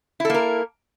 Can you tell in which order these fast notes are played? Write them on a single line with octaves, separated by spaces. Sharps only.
E4 A4 A#3 A#4